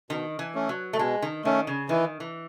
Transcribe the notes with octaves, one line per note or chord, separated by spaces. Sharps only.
B2 D#3
E3
A3 C#4
F#3
A3
B2 G#3
D#3
D#3 A3 C#4
C#3
D#3 E3
E3